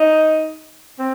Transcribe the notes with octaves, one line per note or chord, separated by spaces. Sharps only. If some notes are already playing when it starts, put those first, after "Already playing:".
Already playing: D#4
C4